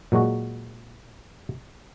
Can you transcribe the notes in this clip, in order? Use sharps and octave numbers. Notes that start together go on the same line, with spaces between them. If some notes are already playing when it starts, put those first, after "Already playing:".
A#2 F#3 G#3 F#4